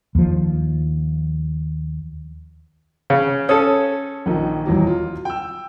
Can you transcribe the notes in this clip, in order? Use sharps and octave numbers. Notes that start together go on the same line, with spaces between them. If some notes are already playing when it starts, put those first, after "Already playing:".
D#2 F3
C#3
C#4 A4 D#6
A#1 D#3 D#4
D#1 E2 F#3
F4
G5 E6